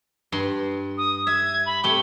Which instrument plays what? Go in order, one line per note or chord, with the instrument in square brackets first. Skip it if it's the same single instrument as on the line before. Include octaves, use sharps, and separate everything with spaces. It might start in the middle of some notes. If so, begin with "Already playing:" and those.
[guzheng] G2 C6
[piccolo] D#6
[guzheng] E5 [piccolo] G#6
[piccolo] B5
[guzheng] C3 A3 G4 [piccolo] G7